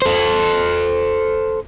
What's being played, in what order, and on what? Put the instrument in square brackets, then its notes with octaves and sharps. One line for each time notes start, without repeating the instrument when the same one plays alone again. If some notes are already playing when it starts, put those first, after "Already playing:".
[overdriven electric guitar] A4 C5